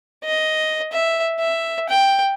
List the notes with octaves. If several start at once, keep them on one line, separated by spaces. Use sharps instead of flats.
D#5
E5
E5
G5